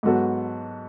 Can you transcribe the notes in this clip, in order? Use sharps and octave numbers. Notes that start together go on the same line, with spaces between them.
G#2 F#3 B3 F#4 A4